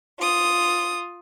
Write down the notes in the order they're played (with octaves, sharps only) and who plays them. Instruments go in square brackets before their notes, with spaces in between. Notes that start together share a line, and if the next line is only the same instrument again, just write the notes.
[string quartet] F4 D#6